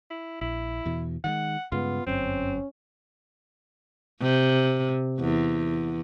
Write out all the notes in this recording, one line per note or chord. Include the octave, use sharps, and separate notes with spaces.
E4
A#1 E4
E2 B2 E3
D#3 G3 G#3 F#5
G2 C#3 G#3 B3 F4
G1 F#2 C4 C#4
C3
E2